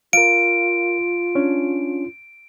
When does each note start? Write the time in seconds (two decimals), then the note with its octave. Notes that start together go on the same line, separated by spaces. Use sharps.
0.13 F4 A#4 F5 D7
1.35 C#4 D4 C#5